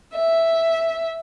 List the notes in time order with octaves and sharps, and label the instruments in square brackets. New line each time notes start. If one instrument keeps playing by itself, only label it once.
[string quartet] E5